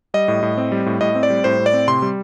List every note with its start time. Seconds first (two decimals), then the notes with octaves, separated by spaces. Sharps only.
0.14 G3 D#5
0.28 A2
0.43 A2
0.57 C4
0.72 G3
0.86 A2
1.01 A2 D#5
1.15 C4
1.23 D5
1.30 G3
1.44 A2 C5
1.59 A2
1.66 D5
1.73 C4
1.88 C3 C6
2.02 G3